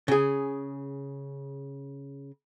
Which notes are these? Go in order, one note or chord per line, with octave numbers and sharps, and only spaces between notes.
C#3 G#4